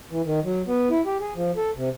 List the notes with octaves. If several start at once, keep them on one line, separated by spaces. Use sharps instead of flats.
E3
D#3
F#3
B3
E4
G4
G#4
F3
A4
C3